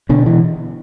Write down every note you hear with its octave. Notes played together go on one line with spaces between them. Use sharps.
B2 D3
E3